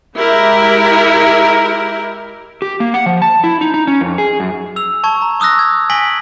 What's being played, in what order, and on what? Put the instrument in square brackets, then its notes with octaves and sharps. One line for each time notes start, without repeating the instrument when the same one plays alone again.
[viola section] G#3 E4 G4 A#4
[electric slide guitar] G4
A#3
F#5
F3
A5
E4
D#4
D#4
C#4
F2
G#4
F#2
[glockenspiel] E6 F7
A5 C#6 G#6
A#5
C#6 D#6 E6 F#6 A#6
G#6
G#5 A#6 B6 D7 F#7 G7